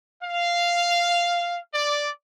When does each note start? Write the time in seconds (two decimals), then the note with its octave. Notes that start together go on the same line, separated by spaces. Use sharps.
0.22 F5
1.74 D5